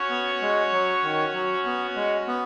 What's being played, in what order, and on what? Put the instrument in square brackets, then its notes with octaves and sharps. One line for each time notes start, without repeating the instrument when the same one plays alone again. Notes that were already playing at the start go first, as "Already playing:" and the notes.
Already playing: [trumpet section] C#4 F#4 C#5
[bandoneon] B3
G#3
F#3
D#3
F#3
B3
G#3
B3